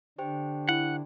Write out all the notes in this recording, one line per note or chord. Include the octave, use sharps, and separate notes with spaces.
D3 D4 G4 C5 G5
E4 F#5